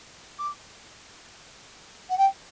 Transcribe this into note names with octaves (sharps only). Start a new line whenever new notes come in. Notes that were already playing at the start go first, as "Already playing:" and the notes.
D6
F#5
G5